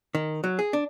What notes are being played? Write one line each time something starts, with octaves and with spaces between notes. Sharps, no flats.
D#3
F#3
G#4
D4